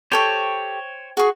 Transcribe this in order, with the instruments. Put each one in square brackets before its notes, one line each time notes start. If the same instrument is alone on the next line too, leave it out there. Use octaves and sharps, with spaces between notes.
[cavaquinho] G4 A4 C#6 [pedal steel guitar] C5 C#5 G5
[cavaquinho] F#4 C#6 [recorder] G#4